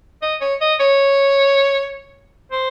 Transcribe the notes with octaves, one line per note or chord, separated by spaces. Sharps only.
D#5
C#5
D#5
C#5
C5